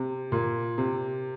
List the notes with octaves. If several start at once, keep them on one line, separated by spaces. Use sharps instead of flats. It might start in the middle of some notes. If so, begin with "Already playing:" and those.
Already playing: C3
A#2
C3